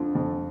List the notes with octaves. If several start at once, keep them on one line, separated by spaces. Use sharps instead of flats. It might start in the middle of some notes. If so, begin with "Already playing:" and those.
Already playing: F2 D3 F3
F2